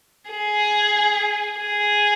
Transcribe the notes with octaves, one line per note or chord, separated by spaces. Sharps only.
G#4
G#4